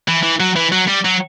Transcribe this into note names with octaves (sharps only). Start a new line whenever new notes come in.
E3
E3
F#3
E3
F#3
G3
F#3